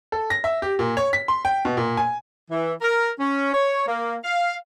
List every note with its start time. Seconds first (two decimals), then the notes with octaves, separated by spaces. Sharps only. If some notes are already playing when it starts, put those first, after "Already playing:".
0.12 A4
0.30 A#6
0.44 E5
0.62 G4
0.79 A#2
0.97 C#5
1.13 B6
1.28 C6
1.45 G5
1.65 B2
1.77 A#2
1.97 G#5
2.51 E3
2.82 A#4
3.18 C#4
3.53 C#5
3.86 A#3
4.23 F5